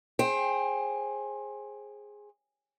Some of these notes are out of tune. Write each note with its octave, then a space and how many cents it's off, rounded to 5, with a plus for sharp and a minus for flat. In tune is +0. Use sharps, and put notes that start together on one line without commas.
G#4 +0 C5 +30 G5 +10